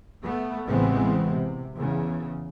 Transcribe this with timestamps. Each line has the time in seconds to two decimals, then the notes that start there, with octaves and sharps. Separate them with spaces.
0.22 A3 B3
0.65 A1 C#3 E3 G#3 B3 C4
1.32 C3
1.74 E2 C#3